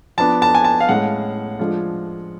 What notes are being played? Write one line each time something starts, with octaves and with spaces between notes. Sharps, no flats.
F3 B3 D4 A5
A5
G#5
A5
F5
A2 G#3 C#4 F#5
F3 G#3 D4 F4